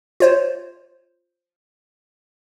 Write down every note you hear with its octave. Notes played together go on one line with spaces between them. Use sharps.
F4 C5 C#5